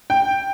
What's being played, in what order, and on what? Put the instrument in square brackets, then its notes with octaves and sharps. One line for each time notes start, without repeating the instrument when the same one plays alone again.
[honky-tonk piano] G5